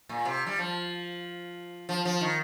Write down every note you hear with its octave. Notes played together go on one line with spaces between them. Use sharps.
A#2
C3
G3
F3
F3
F3
D#3